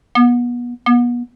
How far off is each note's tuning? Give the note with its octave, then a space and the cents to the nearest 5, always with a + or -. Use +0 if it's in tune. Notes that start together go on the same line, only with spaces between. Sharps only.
B3 -30
B3 -35